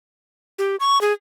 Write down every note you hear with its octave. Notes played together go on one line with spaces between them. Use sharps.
G4
C#6
G#4